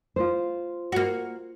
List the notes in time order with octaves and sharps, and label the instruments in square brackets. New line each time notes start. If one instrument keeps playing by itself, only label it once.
[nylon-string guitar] F4 C5
[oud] A#3 F#4